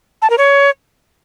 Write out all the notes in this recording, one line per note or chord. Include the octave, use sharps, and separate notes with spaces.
A5
A#4
C#5